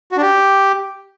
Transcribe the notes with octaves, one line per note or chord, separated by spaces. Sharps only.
F#4
D4
G4